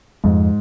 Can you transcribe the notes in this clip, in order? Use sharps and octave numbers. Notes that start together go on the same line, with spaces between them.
F2 G#2